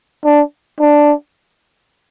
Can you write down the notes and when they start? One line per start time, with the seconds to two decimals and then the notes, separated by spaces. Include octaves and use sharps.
0.25 D4
0.80 D4